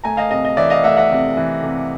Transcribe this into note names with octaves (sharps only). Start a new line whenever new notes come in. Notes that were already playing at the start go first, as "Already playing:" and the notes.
A3 G#5 A#5
D#5 F5
C3 D#5
D#5
E3 D5 E5
D#5 F5
A3 E5 F#5
E5 F#5
C3
E3
C3